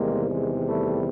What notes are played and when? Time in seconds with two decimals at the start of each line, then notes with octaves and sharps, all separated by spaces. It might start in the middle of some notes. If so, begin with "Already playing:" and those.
Already playing: E2 C3 D#3 G3 G#3 A#3
0.29 G#3
0.67 G3 A3